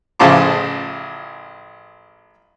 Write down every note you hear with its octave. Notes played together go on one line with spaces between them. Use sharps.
A1 C#3 F3 A5 C6 D6